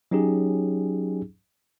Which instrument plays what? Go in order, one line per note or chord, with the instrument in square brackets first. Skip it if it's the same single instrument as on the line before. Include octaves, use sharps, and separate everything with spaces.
[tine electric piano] F#3 C#4 D#4 G4 G#4